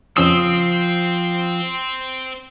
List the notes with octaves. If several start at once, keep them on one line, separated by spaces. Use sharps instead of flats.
F2 C#3 F3 C4 D#6 E6